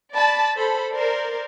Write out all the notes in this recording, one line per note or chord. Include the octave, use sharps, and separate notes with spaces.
D5 A5 B5
A4 C5 B5
A#4 C5 D5